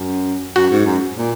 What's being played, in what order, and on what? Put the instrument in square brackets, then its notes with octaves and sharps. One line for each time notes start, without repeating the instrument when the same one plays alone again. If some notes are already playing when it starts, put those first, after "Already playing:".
Already playing: [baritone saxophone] F#2
[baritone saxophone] F#2 [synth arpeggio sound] F#4
[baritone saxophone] G#2
F#2
A#2